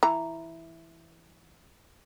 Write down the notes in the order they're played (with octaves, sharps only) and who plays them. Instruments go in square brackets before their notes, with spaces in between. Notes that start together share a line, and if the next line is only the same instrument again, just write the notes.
[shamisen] E3 A#5